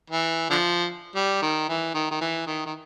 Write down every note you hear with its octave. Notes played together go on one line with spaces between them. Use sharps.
E3
D3 F3
G3
D#3
E3
D#3
D#3
E3
D#3
D#3